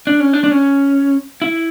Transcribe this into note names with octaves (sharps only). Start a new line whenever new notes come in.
D4
C#4
D4
D4
C#4
E4